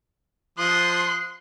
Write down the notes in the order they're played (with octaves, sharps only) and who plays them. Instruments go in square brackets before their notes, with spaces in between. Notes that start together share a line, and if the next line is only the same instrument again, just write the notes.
[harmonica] F3 D#6 [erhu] C6 [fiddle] F#6